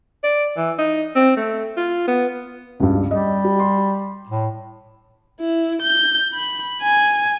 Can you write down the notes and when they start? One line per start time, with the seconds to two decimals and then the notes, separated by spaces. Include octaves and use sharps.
0.23 D5
0.57 E3
0.78 D#4
1.15 C4
1.36 A3
1.77 F4
2.07 B3
2.80 C#2 G2
3.11 G3 D#5
3.44 G4
3.59 C6
4.29 A2
5.41 E4
5.82 G6
6.33 B5
6.82 G#5